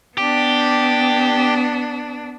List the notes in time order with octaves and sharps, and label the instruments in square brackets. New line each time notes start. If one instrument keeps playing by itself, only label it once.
[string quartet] B3 D4 [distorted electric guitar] G4